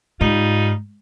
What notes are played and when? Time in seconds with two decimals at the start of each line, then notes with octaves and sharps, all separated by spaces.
0.21 G#2 G3 D#4 F4